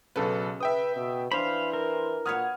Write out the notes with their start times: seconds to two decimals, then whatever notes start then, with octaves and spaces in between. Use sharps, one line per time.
0.16 B1 C#3 A4 B4
0.60 B4 E5 G5 D#6
0.96 B2
1.32 E3 D4 C5 F5 B5
1.73 A#4
2.26 A#2 F#4 B4 C#5 D#6 F6 G#6